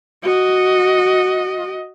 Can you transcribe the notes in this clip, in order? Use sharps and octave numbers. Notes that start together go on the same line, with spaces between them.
F#4 D#5